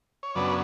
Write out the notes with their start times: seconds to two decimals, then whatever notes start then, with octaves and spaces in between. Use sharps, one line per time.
0.23 C#5
0.35 F#2 C#3 F#3 B3 D4 B4 D5